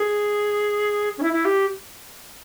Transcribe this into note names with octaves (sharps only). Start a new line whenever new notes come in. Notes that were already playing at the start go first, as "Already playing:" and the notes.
Already playing: G#4
C#4
E4
E4
G4